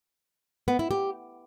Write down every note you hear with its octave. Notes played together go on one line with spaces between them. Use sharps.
B3
E4
G4